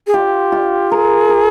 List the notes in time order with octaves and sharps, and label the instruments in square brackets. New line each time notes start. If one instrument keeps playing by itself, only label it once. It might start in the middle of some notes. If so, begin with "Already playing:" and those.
[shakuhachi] G#4
[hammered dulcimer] F4 [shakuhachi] G4
[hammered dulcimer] F4
[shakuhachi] G#4 [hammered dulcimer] A#4
[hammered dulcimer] A#4